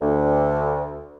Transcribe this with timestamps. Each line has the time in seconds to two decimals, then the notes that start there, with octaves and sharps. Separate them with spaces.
0.01 D2